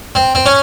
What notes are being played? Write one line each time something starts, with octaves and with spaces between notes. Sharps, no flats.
C4
C4
C#4